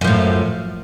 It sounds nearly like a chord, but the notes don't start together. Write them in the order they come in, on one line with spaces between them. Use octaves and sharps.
F#2 F3 A2